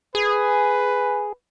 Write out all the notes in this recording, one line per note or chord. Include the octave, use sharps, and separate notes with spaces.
G#4 B4